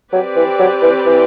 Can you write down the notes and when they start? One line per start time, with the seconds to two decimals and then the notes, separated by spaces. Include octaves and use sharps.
0.12 F#3 C4 G4 B4 D5
0.36 E3
0.59 F#3
0.82 E3
1.06 E3